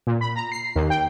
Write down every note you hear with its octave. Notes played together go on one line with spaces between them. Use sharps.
A#2
B5
A#5
C7
D#2
G5